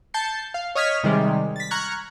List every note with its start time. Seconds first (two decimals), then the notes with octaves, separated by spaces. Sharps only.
0.14 A5 G6 A6 C7 C#7
0.54 F5
0.75 C#5 D#5 D#6 F6 G#6 B6
1.03 C3 D#3 G3 G#3
1.56 A6 B6
1.71 A#5 C#6 F6 F#6 G#6